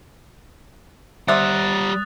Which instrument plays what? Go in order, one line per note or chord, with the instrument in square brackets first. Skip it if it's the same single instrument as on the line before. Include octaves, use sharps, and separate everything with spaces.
[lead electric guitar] G3 F#5 [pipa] C5 D5 E5 [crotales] D#6 F#6 A6